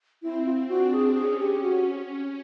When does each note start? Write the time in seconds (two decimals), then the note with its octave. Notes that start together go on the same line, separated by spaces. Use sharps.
0.22 C4 E4
0.46 F4
0.69 D4 F#4
0.92 G#4
1.15 C#4 G#4
1.39 G4
1.62 F#4